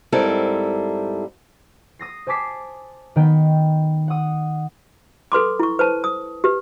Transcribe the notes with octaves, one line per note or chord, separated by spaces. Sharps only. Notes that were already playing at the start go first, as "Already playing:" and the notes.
G#2 G3 C4 E4 A4 A#4
D#6 A#6 C7
C5 G#5 A5 D6 B6 C7
D#3 B3 G5 G6
F#5 D#6
A4 B4 C6 D6
E4 C#6
B4 C5 A5
D#6
G4 B4